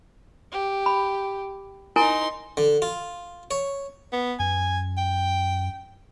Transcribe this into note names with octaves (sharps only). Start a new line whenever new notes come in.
G4
B5
D#4 E4 A#4 G#5 C6
D3
F4
C#5
B3
F#2 G#5
G5